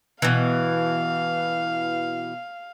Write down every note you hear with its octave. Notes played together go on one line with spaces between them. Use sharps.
B2 E3 F5